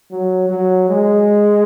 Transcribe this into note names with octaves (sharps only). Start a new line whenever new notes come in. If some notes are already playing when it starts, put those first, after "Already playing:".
F#3
F#3
G#3